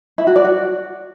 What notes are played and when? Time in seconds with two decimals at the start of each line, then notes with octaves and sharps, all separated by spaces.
0.18 E4
0.27 F#4
0.36 D5
0.44 F#4